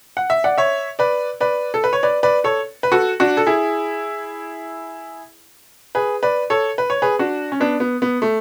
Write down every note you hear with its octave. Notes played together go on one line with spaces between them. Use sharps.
F#5
E5
D5 F#5
C#5 E5
B4 D5
B4 D5
A4
B4
C#5
B4 D5
B4 D5
A4 C#5
B4
F#4 A4
D4 F#4
A4
E4 G#4
G#4 B4
B4 D5
A4 C#5
B4
C#5
G#4 B4
D4 F#4
C#4
B3 D4
B3
B3
A3